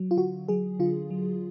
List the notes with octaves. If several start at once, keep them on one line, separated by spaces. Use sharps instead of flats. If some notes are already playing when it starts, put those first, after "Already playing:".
Already playing: F#3
F4
D3 F#4
F#3 G#4
D3 F4
F#3